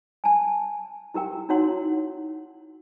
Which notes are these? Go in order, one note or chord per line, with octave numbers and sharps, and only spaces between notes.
G#5 A5
E4 G4 A#4 G5
D#4 E4 F#4 C#5 F#5 C6